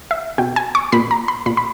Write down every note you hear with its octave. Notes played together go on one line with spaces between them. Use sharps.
E5
B2 G5
G#5
C#6
A#2 B5
A#5
B5
A#2 B5
B5